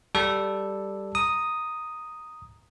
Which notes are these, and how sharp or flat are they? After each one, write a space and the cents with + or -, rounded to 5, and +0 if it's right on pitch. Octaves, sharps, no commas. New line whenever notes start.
G3 +0 A4 +0
A#5 +0 D#6 +0